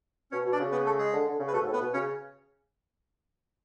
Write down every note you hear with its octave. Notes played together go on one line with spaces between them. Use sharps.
B2 C#4 C#5
B2
D4 D5
C#3
B3 B4
A3 A4
G#3 G#4
D3
D3
C#3
B4
B2 A3 A4
G#2
A2
B3 B4
B2
C#3 C#4 C#5